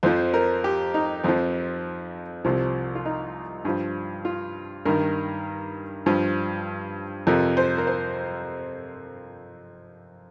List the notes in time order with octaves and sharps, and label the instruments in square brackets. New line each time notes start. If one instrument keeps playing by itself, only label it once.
[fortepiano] F2 F3 C5
A#4
G4
D#4
F2 F3 C4
C2 C3 F3
F4
D#4
G2 F3
F4
G2 D#3 A#4
G2 F3
F2 C3 F3 A#4
C5
A#4
C5